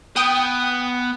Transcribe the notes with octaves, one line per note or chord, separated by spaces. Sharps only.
B3 G5 D#6